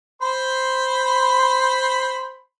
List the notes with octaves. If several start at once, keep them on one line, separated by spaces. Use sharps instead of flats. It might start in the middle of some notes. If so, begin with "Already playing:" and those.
C5 B5 C6